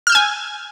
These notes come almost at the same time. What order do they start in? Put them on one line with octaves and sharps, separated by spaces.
F6 G6 E6 G#5